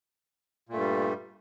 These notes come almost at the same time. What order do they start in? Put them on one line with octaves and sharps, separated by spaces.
A#2 A3 G2 G3